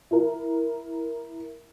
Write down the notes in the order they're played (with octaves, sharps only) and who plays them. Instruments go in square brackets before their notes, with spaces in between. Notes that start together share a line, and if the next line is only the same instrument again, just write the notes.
[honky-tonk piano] E4 A#4